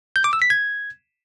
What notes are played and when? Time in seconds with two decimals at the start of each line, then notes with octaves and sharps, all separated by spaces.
0.16 G6
0.24 D6
0.33 E6
0.42 B6
0.50 G#6